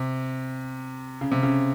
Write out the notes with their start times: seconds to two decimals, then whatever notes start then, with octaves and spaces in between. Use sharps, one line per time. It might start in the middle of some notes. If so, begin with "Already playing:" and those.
Already playing: C3
1.21 C#3
1.32 C3
1.43 C#3